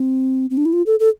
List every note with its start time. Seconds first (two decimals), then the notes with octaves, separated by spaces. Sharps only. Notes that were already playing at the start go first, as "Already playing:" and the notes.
Already playing: C4
0.50 C4
0.57 D4
0.65 E4
0.73 F4
0.86 A4
1.00 A4